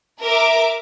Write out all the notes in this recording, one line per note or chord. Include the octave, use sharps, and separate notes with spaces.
A#4 E5 D6